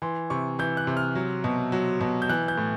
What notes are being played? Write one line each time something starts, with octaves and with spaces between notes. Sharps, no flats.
E3 C6
C3 C#6
E3 G6
F#6
C3
F6
F#3
B2
F#3
B2
G6
E3 F#6
G6
A2